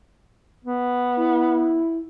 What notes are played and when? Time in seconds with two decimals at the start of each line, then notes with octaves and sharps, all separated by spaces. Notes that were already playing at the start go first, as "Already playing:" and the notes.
0.64 B3
1.18 E4